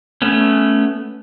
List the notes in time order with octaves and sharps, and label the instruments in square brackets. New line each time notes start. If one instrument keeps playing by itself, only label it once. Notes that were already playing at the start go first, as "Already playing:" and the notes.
[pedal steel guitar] A3 B3 C#4